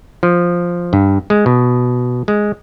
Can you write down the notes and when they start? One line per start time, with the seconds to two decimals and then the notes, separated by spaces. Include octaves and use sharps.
0.23 F3
0.93 G2
1.30 G#3
1.46 B2
2.28 G#3